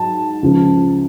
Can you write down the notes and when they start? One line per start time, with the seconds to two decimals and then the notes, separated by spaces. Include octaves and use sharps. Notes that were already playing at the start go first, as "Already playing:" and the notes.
Already playing: G#2 F#3 A5
0.43 C#2 C#3 F3